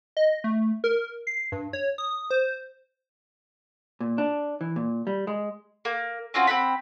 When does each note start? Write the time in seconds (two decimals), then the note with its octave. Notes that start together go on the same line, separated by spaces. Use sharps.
0.17 D#5
0.44 A3
0.84 A#4
1.27 C7
1.52 G2
1.73 C#5
1.98 D#6
2.31 C5
4.00 A#2
4.18 D4
4.61 E3
4.76 A#2
5.07 G3
5.27 G#3
5.85 A#3
6.34 C4 C#4 F4 F#4
6.47 C4 C#4 F#5 B5